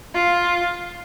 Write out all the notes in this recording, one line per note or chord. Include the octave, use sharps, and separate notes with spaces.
F4